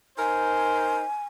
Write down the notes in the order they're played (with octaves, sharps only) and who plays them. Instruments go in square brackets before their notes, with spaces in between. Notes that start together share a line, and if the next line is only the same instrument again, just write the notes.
[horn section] D#4 A#4 C5 [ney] G#5